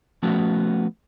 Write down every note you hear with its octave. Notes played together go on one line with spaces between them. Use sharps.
F3 A3 B3 C#4 F#4